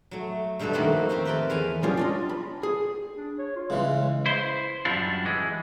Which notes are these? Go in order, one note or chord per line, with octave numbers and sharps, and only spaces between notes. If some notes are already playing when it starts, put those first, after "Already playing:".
F#3 A3
G2 B2 A3 A4 B4
F2 D#3 A#3 C4 F#4 B5
A3 C4 G4
A#4 B4 G5 A5 B5
E2 F5 G#5 A#5
F#3 G#3 C#4 D4 F4 G4
D4 F4 D#5
B5
G#4
D4
C#5
F4
C#3 E3 G#3
E4 C5
F#2 G3 D4 E4 F4
E3 G#3